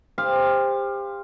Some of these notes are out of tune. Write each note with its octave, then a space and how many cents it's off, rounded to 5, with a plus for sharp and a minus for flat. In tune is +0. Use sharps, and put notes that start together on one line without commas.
G4 +30 C5 +0 F5 +0